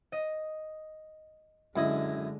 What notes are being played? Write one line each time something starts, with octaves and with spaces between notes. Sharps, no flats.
D#5
F#2 D3 G#3 E4 D#5